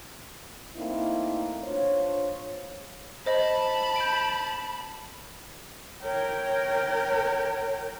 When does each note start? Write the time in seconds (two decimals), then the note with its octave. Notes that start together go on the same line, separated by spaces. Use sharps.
0.76 A3 A#3 C4 D#4 E4
1.64 D4 F4 C5 C#5
3.26 C5 D#5 A5 B5
3.96 G6 D7
6.03 A#4 C#5 G5